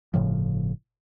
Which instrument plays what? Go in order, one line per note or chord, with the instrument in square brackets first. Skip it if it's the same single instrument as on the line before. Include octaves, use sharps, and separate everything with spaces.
[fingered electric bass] G1 A2 C#3 F3